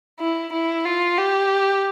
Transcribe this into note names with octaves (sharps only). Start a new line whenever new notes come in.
E4
E4
F4
G4